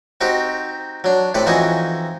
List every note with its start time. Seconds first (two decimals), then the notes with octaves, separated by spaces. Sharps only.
0.21 C4 D#4 F#4 G4
1.04 F#3 D4
1.34 A2 C3 B4 D5 D6
1.46 F2 E3 D#4 F#4 G#5 D#6